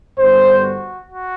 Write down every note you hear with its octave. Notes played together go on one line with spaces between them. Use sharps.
G2 D3 G3 B3 C5
F#4
F#4